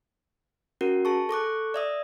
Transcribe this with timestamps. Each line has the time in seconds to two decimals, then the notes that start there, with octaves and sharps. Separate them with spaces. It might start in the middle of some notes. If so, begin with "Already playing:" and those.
0.81 C#4 F#4 A#4
1.05 G#4 A5 C#6
1.29 A4 C#6 D6 F#6
1.74 D5 E5 D#6